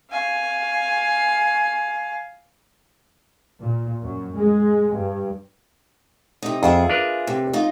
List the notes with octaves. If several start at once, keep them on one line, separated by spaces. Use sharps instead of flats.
F5 G#5
A#2
F#2
G#3
G2
C3 D#4
F2 F4 G#4 E5
D4 A#4 B4
C3
D#4 F4